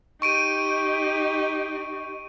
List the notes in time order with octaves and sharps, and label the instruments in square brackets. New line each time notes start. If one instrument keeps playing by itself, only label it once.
[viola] D#4 G4 [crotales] C#6 D7 D#7